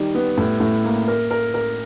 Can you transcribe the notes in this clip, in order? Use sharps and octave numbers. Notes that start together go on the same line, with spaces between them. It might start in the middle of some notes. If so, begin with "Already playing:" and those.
Already playing: D#3 G3
B3
A2
A2
A#3
A#4
A#4
A#4